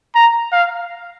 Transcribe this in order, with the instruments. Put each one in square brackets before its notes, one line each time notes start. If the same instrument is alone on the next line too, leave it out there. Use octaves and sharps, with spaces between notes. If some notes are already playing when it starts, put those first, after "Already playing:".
[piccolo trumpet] A#5
F5